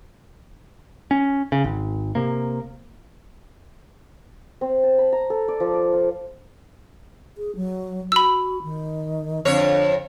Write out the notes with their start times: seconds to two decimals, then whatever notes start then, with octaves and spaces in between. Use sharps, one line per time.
1.11 C#4
1.52 C#3
1.64 G#1
2.15 C3 A#3
4.61 C4
4.84 A5
4.99 B5
5.12 A#5
5.30 A4
5.48 D5
5.60 F3
5.74 D5
5.93 F4
7.38 G#4
7.56 F#3
8.12 F#4 B5 E6
8.63 D#3
9.45 F2 D3 C#5